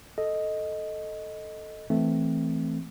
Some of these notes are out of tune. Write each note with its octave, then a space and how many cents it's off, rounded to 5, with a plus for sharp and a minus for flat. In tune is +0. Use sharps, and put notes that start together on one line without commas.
A4 +0 D#5 +0
E3 +0 A3 +0 C4 +0